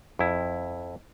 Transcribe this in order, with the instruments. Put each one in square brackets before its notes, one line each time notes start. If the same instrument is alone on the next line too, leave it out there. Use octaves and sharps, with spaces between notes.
[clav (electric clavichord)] F2 E4